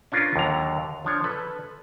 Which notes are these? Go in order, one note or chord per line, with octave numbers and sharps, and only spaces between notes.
C#4 D4 F4 A#4 B4
D#2 D3 F#3 A#5
F3 D4 C#5
A4 B4